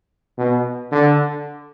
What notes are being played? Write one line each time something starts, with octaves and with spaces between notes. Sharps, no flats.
B2
D3